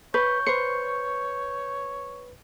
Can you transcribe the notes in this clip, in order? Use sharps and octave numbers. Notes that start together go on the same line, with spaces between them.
B4 C#5 C#6 G6
B4 C5 C#7